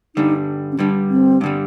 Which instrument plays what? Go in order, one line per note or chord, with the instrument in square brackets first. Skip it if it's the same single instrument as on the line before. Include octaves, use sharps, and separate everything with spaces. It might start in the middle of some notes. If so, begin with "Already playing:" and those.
[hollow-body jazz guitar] G2 D3 G3 [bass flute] D#4
[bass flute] C#4
[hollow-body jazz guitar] G2 D3 G3 [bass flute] D4
[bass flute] C4
[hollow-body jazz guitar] G2 D3 G3